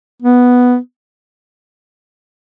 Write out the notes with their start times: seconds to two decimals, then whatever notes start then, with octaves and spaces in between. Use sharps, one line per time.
0.22 B3